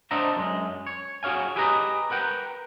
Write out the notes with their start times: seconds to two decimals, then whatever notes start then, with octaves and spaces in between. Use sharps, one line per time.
0.11 D4 C5 D#5 E5 F#5 A#5
0.37 F#2 G#3
0.87 C#5
1.23 F#4 G#4 C#5 F5 G#5
1.56 E4 G4 G#4 B4 D#5 A#5
2.10 A#4 B4 F#5 G5